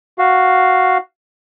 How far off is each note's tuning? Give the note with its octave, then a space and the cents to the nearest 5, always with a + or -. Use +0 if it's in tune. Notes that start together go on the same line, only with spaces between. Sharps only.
F#4 +0 F5 +0